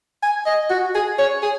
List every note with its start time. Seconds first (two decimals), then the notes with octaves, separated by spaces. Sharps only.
0.23 G#5
0.46 D#5
0.70 F#4
0.95 G#4
1.19 C#5
1.43 G#4